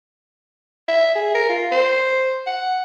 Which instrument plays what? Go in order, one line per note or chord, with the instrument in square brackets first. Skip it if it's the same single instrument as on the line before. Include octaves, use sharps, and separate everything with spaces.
[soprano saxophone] E5
G#4
A#4
F4
C5
F#5